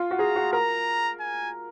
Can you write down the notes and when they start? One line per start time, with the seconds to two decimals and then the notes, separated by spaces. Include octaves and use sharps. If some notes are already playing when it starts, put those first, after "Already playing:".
Already playing: F4
0.11 F#4
0.19 G#4 A#5
0.36 F#4
0.53 A#4 A#5
1.20 G#5